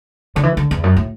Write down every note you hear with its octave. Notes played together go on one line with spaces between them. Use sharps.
D3
E3
D3
E2
F#2
A2